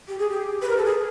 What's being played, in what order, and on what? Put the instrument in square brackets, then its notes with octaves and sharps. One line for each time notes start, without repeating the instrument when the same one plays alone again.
[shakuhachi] G4
G#4
G4
B4
A#4
A4
G#4